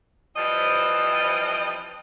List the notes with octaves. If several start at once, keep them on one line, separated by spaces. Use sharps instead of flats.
E3 F3 G3 C4 B4 D#5